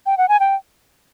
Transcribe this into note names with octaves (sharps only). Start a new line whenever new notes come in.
G5
F#5
G#5
G5